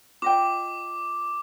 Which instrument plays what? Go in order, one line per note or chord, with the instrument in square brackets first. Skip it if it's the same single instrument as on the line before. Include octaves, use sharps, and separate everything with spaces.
[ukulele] F4 D#5 G5 [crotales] D6